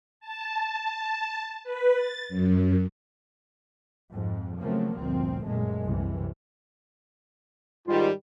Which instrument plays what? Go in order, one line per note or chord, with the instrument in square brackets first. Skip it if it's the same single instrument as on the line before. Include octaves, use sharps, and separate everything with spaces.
[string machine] A5
A5
B4
A6
F#2
[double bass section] F2 G#2
C#3 F3 F#3 A3 A#3 C4
G1 D2 A#2 F3 C4
F#2 A#2 G#3 A3
C2 F#2 C3 E3
[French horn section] G#2 D#3 G3 [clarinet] F4